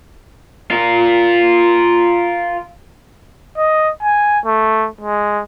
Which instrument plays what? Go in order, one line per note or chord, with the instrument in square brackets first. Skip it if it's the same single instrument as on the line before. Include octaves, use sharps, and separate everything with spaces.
[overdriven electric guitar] F4 A#4
[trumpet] D#5
G#5
A3
G#3